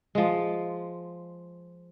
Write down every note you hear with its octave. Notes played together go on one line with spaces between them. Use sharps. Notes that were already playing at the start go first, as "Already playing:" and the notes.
F3 G#3